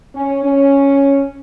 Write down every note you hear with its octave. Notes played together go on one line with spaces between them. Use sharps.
C#4
C#4